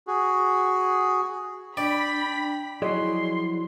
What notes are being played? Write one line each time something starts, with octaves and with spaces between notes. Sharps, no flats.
F#4 G#4
D4 D5 G5 B5 B6
F3 F#3 E4 G#4 D5 D#5 C6